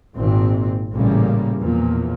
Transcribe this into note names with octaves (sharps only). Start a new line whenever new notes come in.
G#1 A#2 C4
A1 A#2 C#3 G3 A#3
E2 A#2 F3